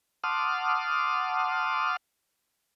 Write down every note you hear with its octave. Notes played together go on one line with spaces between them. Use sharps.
F#5 A5 C6 D6 D#6 F6